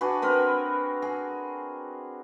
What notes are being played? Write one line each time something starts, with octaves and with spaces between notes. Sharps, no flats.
D4 F#4 G#4 B4
C4 A#4 B4
G#4